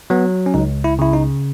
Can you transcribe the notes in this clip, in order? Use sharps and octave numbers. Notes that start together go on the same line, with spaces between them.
F#3 B3
C#4
C#2 D#4
E4
C#3 E4
D#4